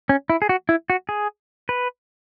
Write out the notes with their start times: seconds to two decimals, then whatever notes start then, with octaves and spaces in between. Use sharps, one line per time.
0.09 C#4
0.30 E4
0.42 G#4
0.49 F#4
0.69 E4
0.90 F#4
1.09 G#4
1.69 B4